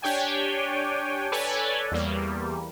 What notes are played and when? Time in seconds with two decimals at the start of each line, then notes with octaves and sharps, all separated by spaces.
0.02 D4 G4 C#5 G5 G#5
1.32 A4 B4 C#5 D5 G#5
1.91 E2 G3 A#3